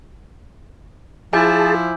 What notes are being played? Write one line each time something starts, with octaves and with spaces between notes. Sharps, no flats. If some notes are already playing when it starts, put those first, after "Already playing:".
F3 E4 G#4 G#5 A5 D6 G6